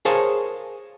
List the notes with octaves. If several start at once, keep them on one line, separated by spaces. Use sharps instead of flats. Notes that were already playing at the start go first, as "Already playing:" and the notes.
G#4 A#4 C5 C#5 F5 A5